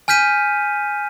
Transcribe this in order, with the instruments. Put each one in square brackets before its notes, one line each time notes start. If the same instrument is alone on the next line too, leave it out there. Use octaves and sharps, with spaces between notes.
[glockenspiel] G#5 F6 G6 B6 D#7